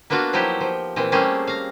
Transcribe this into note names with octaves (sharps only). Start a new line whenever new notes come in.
A#3 B3 D4 F4 F#4 F5
F3 F#3 D#4 E4 G4
F3
A#2 E3 C4
G3 A3 A#3 C4 C#4 G#4
F5 A#5